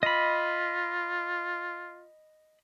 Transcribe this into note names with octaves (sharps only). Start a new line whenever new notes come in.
F4 D#5 B5